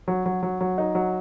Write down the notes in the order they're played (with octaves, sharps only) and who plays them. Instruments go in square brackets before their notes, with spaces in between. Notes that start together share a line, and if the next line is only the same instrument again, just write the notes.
[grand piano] F#3
F#3
F#3
F#3
D#4
F#3